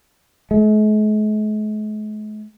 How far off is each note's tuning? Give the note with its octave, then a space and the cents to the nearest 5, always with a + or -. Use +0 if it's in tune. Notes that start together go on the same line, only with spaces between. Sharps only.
G#3 +45